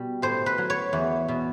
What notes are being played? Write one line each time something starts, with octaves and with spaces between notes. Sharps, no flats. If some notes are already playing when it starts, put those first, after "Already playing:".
Already playing: B2 G3
A2 C5
B4
F#3
C#5
E2
B2